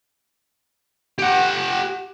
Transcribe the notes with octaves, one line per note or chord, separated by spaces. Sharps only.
G4 F#5